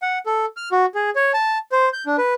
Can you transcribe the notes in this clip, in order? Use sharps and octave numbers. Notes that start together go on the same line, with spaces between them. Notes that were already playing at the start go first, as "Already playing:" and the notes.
F#5
A4
F6
F#4
G#4
C#5
A5
C5
G6
D4
B4